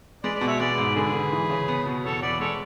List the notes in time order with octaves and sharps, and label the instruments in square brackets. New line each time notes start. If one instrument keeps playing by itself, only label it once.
[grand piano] G#3 [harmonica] B4 D5
[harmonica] B4 D5
[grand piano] B2
[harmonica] C#5 E5
[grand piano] G#3 [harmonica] B4 D5
[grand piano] G#2
[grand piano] D3 [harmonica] G#4 B4
[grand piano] D3
E3
C#3
B3
B2
[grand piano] E2 [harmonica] A4 C#5
[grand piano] E2 [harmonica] B4 D5
[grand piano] G#3 [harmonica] A4 C#5